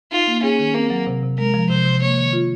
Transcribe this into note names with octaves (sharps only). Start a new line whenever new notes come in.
D#4 F4
A#3
C#4 G#4
D#3
A#3 C4
F#3
C3
C3
G#3 A#4
F3
C3 C5
C3
A#3 C#5
D#3
F4